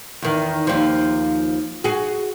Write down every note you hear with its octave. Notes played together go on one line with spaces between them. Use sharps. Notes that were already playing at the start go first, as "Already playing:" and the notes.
E2 D#3
D#2 F3
F#4 G#4